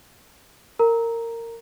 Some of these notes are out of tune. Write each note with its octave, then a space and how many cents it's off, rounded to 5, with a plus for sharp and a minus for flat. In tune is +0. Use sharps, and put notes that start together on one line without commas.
A#4 -20 A#5 +0